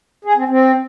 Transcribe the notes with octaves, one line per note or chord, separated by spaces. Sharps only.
G#4
C4
C4